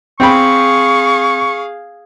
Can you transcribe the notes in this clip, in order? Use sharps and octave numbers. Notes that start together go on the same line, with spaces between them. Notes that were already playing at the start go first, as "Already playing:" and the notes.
C4 G#4 F5 G5 B5 C#6